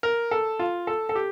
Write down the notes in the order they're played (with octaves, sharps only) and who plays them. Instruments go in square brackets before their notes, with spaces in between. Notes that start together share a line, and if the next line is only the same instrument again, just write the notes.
[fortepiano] A#4
A4
F4
A4
A4
G4